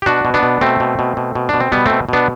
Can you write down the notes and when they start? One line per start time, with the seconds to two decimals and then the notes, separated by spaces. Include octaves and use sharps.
0.02 G4
0.06 B2 D4 F#4
0.25 B2
0.34 B3 D4
0.43 B2
0.61 B2 A3 C4
0.80 B2
0.99 B2
1.17 B2
1.35 B2
1.49 B2 D4
1.60 C4
1.72 B2 G3 B3
1.86 B2 A3 C4
2.09 B2 B3 D4